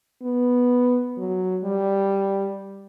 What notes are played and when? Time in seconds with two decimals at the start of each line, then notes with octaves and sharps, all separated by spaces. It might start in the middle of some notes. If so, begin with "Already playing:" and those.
0.22 B3
1.18 F#3
1.64 G3